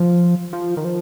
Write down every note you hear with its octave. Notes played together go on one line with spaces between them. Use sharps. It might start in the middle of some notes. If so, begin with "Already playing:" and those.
Already playing: F3
F3
D#3
F3